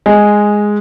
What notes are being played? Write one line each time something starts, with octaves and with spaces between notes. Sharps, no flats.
G#3